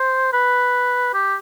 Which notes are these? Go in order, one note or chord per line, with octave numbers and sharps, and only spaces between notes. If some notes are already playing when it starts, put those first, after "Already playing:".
Already playing: C5
B4
G4